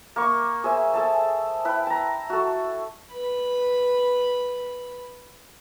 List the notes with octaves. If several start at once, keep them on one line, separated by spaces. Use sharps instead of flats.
A#3 C#6
G#4 C5 E5 G#5
G#4 A4 A5
E4 B4 G5 B5
A5 A#5
F#4 A4
B4 B5